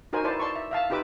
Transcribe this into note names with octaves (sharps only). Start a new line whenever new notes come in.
D#4 F#4 A#4 C5 G#5
E4 B4 C5 D5 A5
D5 A5 C6 C#6
E5
E5 F5 A5
D#4 F4 G4 B4 D6 E6